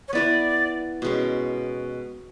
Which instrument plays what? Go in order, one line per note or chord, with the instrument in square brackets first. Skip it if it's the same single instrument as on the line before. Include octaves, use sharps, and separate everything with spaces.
[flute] C#5
[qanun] B3 E4 B4 [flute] D5
[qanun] B2 G#3 C#4